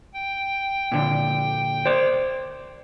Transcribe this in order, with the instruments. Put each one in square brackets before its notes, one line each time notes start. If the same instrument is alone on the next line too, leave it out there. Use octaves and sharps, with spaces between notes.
[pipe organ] G5
[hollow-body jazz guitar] A#2 D3
C5 D5